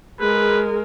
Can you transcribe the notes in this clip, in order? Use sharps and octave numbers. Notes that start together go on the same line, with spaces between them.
G#3 G#4 A#4 B4